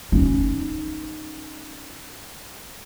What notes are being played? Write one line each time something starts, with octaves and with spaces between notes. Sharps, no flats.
C#4 D#4